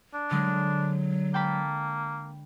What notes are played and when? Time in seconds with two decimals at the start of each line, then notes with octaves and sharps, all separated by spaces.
0.14 D4
0.31 D3 F#3 G#3
1.34 A#3 G5 A5 B5